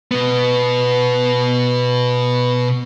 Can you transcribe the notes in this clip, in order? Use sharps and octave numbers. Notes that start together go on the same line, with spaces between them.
B2 B3